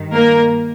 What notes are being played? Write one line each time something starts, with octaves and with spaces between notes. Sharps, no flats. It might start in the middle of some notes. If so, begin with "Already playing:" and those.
Already playing: G2 D#3
A#3 A#4